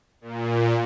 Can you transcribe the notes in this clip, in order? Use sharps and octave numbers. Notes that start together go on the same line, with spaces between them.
A#2